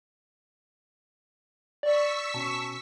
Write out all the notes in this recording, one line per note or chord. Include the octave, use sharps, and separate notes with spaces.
D5 C#6 E6 B6
B2 C#4 A5